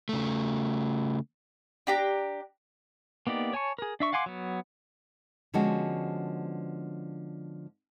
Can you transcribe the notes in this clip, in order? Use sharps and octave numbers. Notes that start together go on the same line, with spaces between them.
C#3 A3
D4 G4 A#5
A#3 B3 D#4 G4 D5
C#5 G#5 A5 C#6
G#4 A#4
D4 E5 C#6
F5 F#5 G#5 C6 D6
F#3 B3
D3 F3 G#3 B3 C#4 F#4